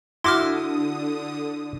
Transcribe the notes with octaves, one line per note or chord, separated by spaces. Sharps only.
D3 E4 F#4 C6 D6 D#6 F6